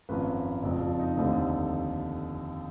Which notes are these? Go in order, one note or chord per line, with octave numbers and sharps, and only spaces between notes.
G#1 F#2 F3 B4
F#1 F2 F3 D5
F4
D#4
F1 D#2 D3 D#4